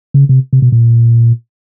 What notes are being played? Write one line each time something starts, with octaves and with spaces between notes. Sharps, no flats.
C#3
C3
C3
B2
A#2